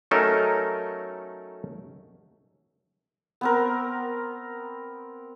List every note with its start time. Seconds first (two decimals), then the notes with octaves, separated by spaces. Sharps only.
0.11 F#3 A3 C#4 D#4 A4 A#4
3.41 B3 C4 A#4